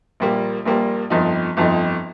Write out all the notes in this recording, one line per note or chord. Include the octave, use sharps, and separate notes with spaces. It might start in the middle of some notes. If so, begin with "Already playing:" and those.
A#1 A#2 G3 A#3
A#1 A#2 G3 A#3
G1 F2 F3 D#4
G1 F2 F3 D#4